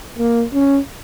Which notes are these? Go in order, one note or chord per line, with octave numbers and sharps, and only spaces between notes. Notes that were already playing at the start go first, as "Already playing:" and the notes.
A#3
C#4